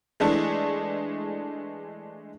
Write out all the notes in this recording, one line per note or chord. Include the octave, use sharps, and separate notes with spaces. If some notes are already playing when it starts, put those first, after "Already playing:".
E3 G#3 A3 D4